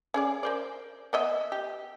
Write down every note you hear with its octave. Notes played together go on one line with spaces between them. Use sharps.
C#4 G#4 D5
A#4 C5 D5
B3 D#5 E5
G4